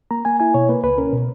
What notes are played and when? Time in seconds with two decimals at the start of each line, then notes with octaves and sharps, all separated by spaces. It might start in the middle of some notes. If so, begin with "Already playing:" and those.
0.11 A#3 A#5
0.25 A#3 G#5
0.40 E4 G#5
0.54 B2 C#5
0.69 A#3 B4
0.84 C#2 B4
0.98 C#4 A#4
1.13 B2